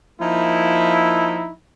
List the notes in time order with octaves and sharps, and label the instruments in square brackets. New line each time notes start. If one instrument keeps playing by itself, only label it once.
[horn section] F3 A#3 D#4 E4